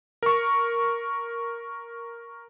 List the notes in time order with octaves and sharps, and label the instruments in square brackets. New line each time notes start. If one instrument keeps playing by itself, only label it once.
[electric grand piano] A#4 C#6